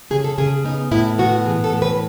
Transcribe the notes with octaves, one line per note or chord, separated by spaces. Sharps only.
C#3 G#4
A4
C#3 G#4
B3 D#4
A2 E4
B3 F#4
E3 G#4
A4
A2
B4